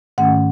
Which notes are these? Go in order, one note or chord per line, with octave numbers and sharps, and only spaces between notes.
G#2 D#3 A3 C#4 F#5